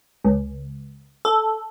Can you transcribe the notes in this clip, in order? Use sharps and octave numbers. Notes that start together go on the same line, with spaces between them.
C#2
A4